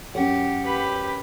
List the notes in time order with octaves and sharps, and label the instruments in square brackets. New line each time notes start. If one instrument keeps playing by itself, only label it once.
[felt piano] F#2 C#4 C#5 [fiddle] G4 [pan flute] F#5
[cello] G4 [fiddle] B4 B5